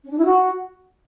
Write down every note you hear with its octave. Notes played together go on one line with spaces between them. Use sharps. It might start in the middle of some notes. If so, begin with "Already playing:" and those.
C#4
D4
E4
F#4